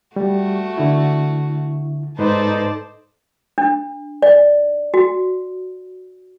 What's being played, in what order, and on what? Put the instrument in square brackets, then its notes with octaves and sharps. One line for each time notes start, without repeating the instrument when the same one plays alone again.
[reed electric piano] G3 [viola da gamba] A3 F#4
[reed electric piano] D3 E4
[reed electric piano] G#2 B4 [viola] D#4 [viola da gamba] A4 C5 D5
[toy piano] D4
D5
F#4